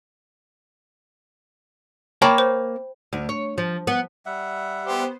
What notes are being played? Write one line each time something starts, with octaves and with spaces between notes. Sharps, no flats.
A#3 C#5 G5 A5 B5
C5
D2
C#5
F3
B3
G3 E5 F#5
B3 G4 C5